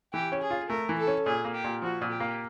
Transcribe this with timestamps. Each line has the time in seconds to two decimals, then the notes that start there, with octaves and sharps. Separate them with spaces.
0.13 E3 G4
0.32 C#4
0.42 G#4
0.50 F4
0.70 A3 A#4
0.89 E3
0.98 A4
1.07 C#4
1.26 A#2 G#4
1.45 A#3
1.55 G4
1.64 A#2
1.82 F3 F#4
2.01 A#2
2.11 G4
2.20 A#3